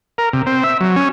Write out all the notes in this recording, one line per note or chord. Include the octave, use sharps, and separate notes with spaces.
A#4
C3
C4
E5
F#3
C#4